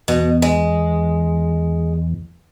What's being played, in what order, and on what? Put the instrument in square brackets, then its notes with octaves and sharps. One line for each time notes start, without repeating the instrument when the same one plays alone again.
[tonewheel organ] E2 [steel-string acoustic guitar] B2
[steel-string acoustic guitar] G#3